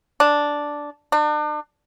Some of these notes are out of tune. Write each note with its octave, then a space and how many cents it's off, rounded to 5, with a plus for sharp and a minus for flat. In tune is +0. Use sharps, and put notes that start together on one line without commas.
D4 -5
D4 +40